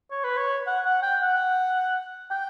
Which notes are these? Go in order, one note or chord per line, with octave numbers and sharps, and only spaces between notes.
C#5
B4
C#5
F#5
F#5
G5
F#5
G5